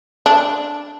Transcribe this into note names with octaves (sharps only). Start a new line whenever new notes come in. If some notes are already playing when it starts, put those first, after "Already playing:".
D4